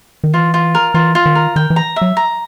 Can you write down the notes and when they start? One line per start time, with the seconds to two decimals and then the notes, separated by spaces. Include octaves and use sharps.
0.24 D#3
0.34 E3 F4
0.54 F4
0.75 A#4
0.94 E3 F4
1.15 F4
1.26 D#3
1.35 A#4
1.56 D#3 G5
1.70 E3
1.76 A#5
1.96 E5
2.02 F#3
2.17 A#5